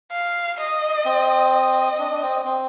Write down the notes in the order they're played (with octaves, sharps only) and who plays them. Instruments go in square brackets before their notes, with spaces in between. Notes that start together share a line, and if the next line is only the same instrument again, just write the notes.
[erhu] F5
D#5
[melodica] C4
[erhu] D#5
[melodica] C4
D4
D4
C4
C4